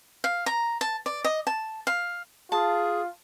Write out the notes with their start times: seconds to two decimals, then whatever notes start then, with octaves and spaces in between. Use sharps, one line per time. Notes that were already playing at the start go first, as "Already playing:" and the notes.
0.24 F5
0.46 A#5
0.81 A5
1.06 D5
1.24 D#5
1.47 A5
1.87 F5
2.52 F4 G#4 A5